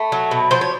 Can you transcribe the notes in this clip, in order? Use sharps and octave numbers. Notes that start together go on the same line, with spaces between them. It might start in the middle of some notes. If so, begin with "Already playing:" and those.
Already playing: A3 B4
F#3
B2
F3 C5
C#5